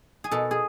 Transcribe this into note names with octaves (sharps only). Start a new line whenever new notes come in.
G#4
B2 A4
G#4